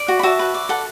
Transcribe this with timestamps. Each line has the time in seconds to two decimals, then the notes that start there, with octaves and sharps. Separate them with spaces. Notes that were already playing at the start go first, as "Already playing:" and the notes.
Already playing: D5
0.08 F#4
0.19 B5
0.23 F#4 E5 A5
0.39 B4
0.54 D5
0.69 A4 F#5